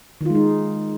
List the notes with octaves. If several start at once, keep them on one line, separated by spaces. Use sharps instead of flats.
D#3 G#3 D#4 F4